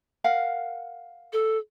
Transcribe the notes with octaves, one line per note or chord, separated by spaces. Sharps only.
A#4 F5 F#5
A4